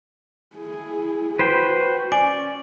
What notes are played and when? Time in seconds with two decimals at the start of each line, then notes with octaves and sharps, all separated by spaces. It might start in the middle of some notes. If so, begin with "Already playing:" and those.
0.56 E4 G#4
1.39 F#4 B4 C5 G5
2.12 C#4 D5 G#5